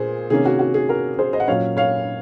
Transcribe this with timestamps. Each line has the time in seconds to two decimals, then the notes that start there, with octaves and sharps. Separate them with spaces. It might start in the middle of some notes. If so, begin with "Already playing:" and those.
Already playing: A#2 G#4 C5
0.30 C3 D#3 A#3 C#4 G#4
0.45 F#4
0.59 F#4
0.74 G#4
0.89 F#4 A#4
1.19 G#4 C5
1.33 C5 D#5
1.40 F#5
1.47 A#2 F#3 C#4 C#5 F5
1.77 C#5 F5